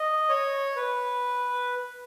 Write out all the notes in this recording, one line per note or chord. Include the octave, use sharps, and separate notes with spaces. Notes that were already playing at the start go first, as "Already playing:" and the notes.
Already playing: D#5
C#5
B4